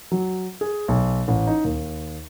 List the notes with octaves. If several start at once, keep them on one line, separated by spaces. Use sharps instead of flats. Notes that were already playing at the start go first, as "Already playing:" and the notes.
F#3
G#4
B1
A1
D#4
D#2